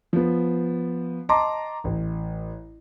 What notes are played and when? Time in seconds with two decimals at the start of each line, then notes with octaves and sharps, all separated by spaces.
0.13 F3 B3
1.29 D#5 A5 A#5 C6 D6
1.84 A1